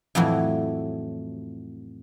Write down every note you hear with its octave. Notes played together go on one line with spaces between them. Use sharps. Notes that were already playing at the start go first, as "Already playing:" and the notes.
F2 A2 E3 F#3